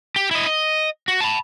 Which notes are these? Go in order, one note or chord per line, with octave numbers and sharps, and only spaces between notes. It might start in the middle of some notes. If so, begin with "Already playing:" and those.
G4
E4 D#5
D#5
F#4
A5 B5